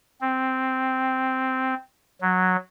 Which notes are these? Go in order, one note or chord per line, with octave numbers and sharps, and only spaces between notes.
C4
F#3